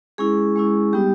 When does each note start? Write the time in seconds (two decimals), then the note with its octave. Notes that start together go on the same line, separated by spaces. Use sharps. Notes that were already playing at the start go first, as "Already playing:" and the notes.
0.18 G#3 C#4 E4 G#4
0.56 G#3 C#4 E4
0.93 G3 B3 D#4 G4